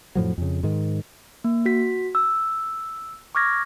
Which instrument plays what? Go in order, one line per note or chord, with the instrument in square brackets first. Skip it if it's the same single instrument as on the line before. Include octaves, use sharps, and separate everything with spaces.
[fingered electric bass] F2 A2 F3 F#3
F2 C#3
G#2 D#3
[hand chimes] A#3
F#4 B6
E6
C#6 D6 F6 G#6 A#6